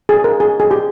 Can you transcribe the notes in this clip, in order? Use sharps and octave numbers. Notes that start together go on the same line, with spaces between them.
G#4
A#4
G#4
G#4
G4